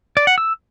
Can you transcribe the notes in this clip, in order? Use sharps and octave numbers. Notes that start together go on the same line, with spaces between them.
D5
F#5
E6